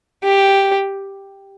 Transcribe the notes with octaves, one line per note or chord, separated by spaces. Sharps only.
G4